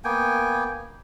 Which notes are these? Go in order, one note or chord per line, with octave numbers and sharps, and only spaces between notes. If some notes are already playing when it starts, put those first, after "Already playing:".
A#3 B3 G5 G#5